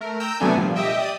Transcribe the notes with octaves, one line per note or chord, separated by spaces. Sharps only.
A3 A#4
G5 A#5 E6 G6
C3 F#3 A3 B3 D4 G#5
A#2 F3 G3
G4 D#5 E5 G5
D5 G5 D#6